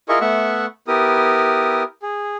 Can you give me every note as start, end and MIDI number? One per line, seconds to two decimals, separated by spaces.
0.09 0.19 64
0.09 0.19 65
0.09 0.19 68
0.09 0.19 70
0.09 0.19 75
0.09 0.19 85
0.21 0.66 57
0.21 0.66 59
0.21 0.66 76
0.21 0.66 78
0.21 0.66 85
0.88 1.83 59
0.88 1.83 64
0.88 1.83 67
0.88 1.83 70
0.88 1.83 87
2.02 2.37 68